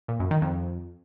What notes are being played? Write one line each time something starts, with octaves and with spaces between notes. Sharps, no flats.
A#2
F#2
D#3
F2